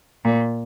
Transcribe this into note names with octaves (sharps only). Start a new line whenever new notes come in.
A#2